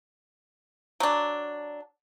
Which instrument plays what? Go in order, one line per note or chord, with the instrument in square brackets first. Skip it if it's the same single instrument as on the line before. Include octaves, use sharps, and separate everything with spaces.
[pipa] F#3 D4